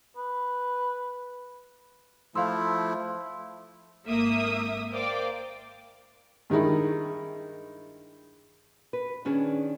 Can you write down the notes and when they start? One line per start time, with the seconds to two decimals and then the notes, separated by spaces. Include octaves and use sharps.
0.17 B4
2.35 F3 A3 E4 F5 C6 E6
4.06 G#1 A#3 E5 D#6
4.91 A#4 C5 D5 F5 G5 D6
6.50 G2 D#3 G#3 D#4 E4
8.93 B4
9.25 D#3 C#4 D4 G#4